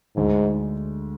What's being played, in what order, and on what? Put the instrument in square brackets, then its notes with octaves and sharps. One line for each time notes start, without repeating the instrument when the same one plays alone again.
[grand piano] D2 D3 G#3 [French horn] G#2